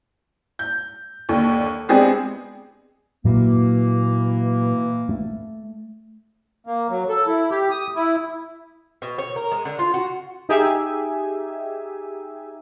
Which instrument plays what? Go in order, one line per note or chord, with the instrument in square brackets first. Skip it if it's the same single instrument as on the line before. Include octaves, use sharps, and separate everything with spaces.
[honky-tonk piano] G6
D#2 D3
G#3 B3 C4 D4 G4 G#4
[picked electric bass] A#2 F#3 [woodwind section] E3 A#3
[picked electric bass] A3
[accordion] A#3
F#3
A4
E4
G4
D#6
E4
[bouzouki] B2
C#5
A#4
G#3
D3
F4
F#4
[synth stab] D#4 G4 G#4 E5 G#5